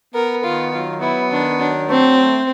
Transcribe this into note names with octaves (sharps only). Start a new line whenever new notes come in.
B3 A#4
D#3 F4
F#3 F4
B3 E4
D#3 D4
F#3 D4
A3 C4
A3